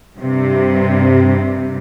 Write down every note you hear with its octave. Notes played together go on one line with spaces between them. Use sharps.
G2 C3